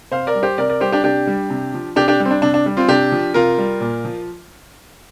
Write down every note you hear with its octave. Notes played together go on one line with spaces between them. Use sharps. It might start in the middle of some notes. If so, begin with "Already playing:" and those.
C3 C5 F5
A#4 D5
G3
G4 C5
C3 A#4 D5
A#4 D5
G3 G4 C5
D4 G4
C3 D4 G4
G3
C3
F3
C3 D4 G4
D4 G4
G3
C4
D4
C3 D4
D4
G3
C4 F4
C3 D4 G4
F3
C3 F4 A#4
G3
A#2
F3